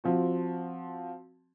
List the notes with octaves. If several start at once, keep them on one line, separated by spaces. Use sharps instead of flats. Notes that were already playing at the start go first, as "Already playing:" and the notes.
F3 C4 F#4